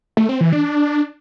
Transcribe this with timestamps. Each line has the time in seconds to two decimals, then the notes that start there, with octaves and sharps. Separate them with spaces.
0.17 A3
0.29 C4
0.41 E3
0.53 D4